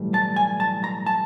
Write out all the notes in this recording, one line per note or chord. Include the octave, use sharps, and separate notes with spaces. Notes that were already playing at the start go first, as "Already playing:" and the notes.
Already playing: B1 A2 E3 G3
A5
G#5
A5
A#5
A5